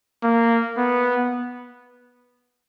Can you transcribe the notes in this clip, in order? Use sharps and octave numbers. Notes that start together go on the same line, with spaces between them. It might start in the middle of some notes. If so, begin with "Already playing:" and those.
A#3
B3